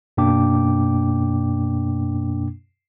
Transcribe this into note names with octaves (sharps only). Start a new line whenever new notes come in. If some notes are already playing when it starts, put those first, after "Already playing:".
F#2 B2 A#3 D4 G5 D6